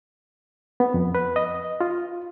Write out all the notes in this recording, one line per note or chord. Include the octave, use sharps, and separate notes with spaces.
B3
F2
B4
D#5
F4